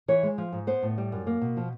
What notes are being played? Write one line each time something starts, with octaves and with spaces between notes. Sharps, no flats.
E3 C#5
G#3
F3
G#2
B3 C5
A2
G3
F#2
A#3
B2
F3